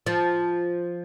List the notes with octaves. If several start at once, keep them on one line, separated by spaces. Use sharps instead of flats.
F3